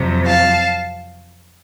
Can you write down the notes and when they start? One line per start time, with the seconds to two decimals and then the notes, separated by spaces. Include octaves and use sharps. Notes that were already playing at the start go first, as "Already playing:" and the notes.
Already playing: F2 C3 F#3
0.25 F5 A5